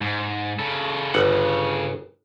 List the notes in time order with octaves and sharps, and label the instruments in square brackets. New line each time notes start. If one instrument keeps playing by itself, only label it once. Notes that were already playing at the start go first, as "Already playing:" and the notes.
[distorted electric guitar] G#2
C#3 A4
[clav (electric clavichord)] G1 F#5